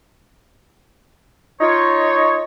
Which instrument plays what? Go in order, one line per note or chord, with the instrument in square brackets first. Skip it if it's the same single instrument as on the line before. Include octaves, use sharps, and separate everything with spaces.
[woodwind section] D#4 F4 C#5